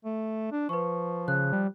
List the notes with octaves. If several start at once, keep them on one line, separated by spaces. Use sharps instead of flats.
A3
D4
F3 B4 C#6
C#3 F#6
G3